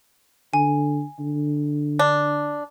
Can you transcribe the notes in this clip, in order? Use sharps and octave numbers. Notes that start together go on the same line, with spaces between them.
D3 G#5
D3
D4